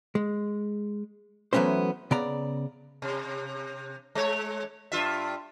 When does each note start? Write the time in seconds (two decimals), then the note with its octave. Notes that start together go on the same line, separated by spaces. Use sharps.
0.15 G#3
1.53 E3 F#3 A3 B3 C#4 C5
2.11 C#3 B3 D5 A#5
3.02 C3
4.15 G#3 C#5
4.92 G2 F4 E5